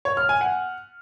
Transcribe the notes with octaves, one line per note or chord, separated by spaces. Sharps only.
C#5
F6
G#5
F#5